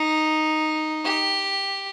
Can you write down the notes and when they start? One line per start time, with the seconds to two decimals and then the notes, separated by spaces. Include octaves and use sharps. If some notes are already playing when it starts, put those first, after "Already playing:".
Already playing: D#4
1.04 G4